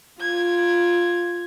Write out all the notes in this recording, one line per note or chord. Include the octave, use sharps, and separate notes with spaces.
F4 G#6